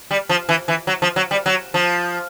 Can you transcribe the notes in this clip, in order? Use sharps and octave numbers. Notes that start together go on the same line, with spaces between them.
G3
F3
E3
E3
F#3
F3
F#3
G3
F#3
F3